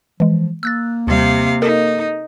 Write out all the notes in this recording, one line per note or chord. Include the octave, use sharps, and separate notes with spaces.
E3 F3 G#3
A#3 E6 F#6 A6
D#2 C3 G3 F5
D#4 A4 A#4